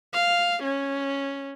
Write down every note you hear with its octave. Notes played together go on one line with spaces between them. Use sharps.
F5
C#4